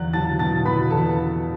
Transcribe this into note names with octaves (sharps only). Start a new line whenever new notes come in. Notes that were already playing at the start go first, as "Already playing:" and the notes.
Already playing: E2 F#3 F#6
F#3 A5 A6
B2 A5 A6
B2 B4 B5
E2 A4 A5